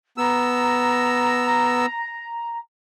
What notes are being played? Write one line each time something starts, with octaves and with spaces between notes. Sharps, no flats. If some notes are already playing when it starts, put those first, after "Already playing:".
B3 A#5 E6